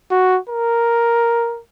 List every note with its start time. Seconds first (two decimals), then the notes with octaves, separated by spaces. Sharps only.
0.11 F#4
0.50 A#4